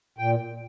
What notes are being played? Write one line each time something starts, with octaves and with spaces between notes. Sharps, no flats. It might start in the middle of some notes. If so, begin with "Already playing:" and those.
A#2 G5